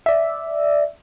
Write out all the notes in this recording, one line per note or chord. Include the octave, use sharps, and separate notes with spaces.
D5 E5